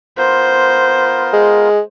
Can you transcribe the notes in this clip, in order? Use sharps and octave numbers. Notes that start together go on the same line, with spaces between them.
B3 F4 A#4 C5
G#3